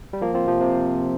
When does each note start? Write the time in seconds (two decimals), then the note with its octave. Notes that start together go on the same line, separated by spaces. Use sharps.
0.13 G3
0.21 F3 A#3
0.34 C4 F4
0.47 C3 F3
0.61 C3